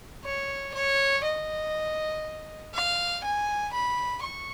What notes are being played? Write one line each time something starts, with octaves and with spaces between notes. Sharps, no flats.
C#5
C#5
D#5
F5
G#5
B5
C#6